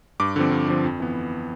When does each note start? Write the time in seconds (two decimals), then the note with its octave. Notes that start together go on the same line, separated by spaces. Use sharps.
0.20 G2 D6
0.36 D3 F3 C4
0.51 G2
0.68 D3 F3 C4
0.84 F2
1.00 E3 B3